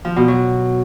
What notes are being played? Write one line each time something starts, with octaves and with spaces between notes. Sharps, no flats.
F3
B2
F#3